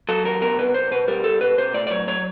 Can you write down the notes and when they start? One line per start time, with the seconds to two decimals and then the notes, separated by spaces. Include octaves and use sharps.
0.09 F#3 A4
0.25 D#2 A#4
0.41 B2 A#4
0.58 C2 B4
0.74 C2 C5
0.91 B2 B4
1.08 G3 A#4
1.24 C2 A4
1.41 B2 B4
1.58 B2 C5
1.74 A2 D5
1.87 D5
1.90 F#3 C#5
2.07 F#3 C#5